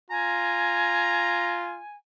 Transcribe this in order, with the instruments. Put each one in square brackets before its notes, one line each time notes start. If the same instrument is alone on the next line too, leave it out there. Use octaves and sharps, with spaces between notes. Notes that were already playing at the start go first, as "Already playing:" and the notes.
[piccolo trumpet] F4 [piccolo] G#5 [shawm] A#5